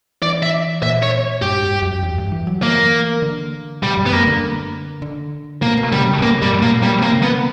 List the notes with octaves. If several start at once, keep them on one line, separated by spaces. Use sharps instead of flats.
E3 D5
E5
A#2 E5
C#5
G2 G4
G2
F#2
E2
G2
E3
F#3
E3 A#3
D3
B2 G3
G2
B3
F#2 A#3
D3
D3
B2 A#3
B2
C#3 G3
C#3
A#2
B2 A#3
G2 G3
A#2 A#3
B2 G3
A#3
C#3
B3